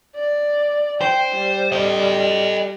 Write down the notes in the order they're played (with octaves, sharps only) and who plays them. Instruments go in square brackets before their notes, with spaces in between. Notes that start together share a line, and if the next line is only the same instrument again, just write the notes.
[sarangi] D5
[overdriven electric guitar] C5 [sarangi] G5
[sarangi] G3
[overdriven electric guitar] A4 D#5